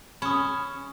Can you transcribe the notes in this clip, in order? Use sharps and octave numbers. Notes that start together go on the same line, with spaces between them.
C#4 B5 D#6